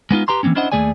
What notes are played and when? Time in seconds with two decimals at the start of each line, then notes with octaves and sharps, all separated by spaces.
0.11 G#3 B3 D#4 F4
0.28 G4 B4 A#5 C6
0.43 E3 A3 A#3 C4 C#4
0.55 C#4 D4 E4 C5 D#5 F#5
0.72 D#2 E3 A3 G#4 D5 G#5